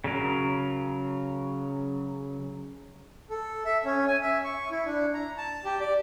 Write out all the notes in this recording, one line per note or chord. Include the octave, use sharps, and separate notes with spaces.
C#3 F#3 A#4
A4
E5
C#4
G#5
E5
C#6
E4
D4
A#5
A5
G4
D5